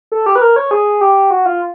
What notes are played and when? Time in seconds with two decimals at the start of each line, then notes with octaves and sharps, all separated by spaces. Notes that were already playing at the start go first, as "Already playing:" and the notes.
0.12 A4
0.26 G4
0.36 B4
0.42 A#4
0.56 C#5
0.71 G#4
1.01 G4
1.31 F#4
1.46 F4